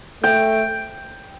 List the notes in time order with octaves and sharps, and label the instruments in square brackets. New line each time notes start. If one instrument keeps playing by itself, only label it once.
[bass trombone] A3 [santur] G5